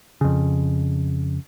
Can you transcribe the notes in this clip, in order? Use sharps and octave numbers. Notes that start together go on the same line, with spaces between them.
F2 C#3